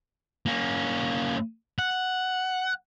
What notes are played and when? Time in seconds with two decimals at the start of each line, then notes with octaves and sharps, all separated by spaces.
0.46 A#3 C#4
1.79 F#5